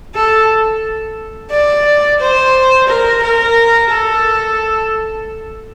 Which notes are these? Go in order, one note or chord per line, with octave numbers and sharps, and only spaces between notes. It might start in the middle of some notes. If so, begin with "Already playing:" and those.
A4
D5
C5
A#4
A#4
A4